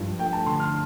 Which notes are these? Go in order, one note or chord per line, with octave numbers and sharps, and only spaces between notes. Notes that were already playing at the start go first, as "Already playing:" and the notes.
Already playing: G2 F3
A3 G5
A5
D3 C6
F6